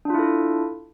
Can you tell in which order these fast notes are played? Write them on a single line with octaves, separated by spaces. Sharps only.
D4 F4 E4 A4